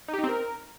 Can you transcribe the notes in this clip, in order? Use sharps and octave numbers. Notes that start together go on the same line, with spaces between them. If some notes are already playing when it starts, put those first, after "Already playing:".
D#4
G4
D#4
C4
A#4